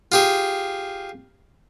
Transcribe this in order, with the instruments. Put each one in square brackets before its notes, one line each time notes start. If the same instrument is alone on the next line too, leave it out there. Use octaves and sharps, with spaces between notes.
[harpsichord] F4 G4 G#4